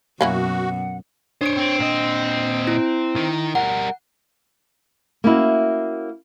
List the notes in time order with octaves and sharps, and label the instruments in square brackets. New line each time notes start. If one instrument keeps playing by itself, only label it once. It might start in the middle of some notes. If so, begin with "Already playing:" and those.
[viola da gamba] F#2 B2 [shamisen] A#3 C#4 E4 [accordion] F#4 [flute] F#5
[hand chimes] D4 D7 [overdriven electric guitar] C5 C#5
[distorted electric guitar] C4
[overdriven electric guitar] A#2 D#5
[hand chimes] E4
[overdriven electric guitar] D#3
[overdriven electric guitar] G3 A#4 [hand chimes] F#5
[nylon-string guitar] A#3 C#4 E4 F#4